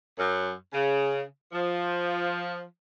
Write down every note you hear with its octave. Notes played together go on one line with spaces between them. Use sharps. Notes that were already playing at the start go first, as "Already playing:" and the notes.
F#2
C#3
F3